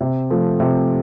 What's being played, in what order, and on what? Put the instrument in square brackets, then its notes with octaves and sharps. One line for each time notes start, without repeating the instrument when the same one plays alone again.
[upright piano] C3
F3 A3
C3